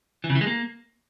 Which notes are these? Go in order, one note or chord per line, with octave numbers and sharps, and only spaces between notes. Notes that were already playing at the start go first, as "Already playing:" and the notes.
E3
C#3
E3
G#3
A#3